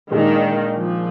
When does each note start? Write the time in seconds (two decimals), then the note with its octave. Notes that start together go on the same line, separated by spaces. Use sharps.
0.10 A#2 D#3 G#3 D4
0.78 F3